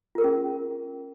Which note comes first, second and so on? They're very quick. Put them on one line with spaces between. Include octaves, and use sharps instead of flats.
F4 A#4 G#4 C#4